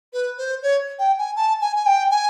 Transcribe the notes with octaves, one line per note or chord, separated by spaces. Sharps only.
B4
C5
C#5
G5
G#5
A5
G#5
G#5
G5
G#5